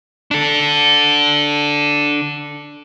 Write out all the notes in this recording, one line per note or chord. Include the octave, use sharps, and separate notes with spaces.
D4 A4